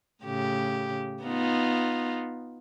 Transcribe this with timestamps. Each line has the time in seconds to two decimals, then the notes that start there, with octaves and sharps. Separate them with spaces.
0.24 A2 C#3 G4
1.23 B3 D#4 F4